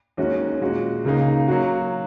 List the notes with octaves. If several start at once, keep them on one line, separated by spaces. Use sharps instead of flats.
D#2 D#3 G#3 C#4 F#4
A#2 G#3 F#4
C#2 C#3 A#3 D#4
F#3 A#3 F#4